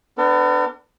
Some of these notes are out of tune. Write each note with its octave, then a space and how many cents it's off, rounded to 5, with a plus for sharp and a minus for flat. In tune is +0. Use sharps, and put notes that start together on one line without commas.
B3 +30 D4 +0 A#4 -45